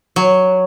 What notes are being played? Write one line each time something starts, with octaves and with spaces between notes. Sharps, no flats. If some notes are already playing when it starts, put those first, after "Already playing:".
F#3